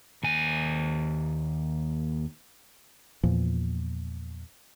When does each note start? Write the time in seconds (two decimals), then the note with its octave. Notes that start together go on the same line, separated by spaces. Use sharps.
0.23 D#2 G#5
3.23 E2 A#2 F3